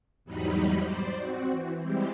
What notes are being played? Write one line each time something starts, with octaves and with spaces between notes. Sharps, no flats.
E2 G#2 F#3 G3 D#4 B5
C5 D5
C4 F#4
E3
G3 G#3 C4 E4 G4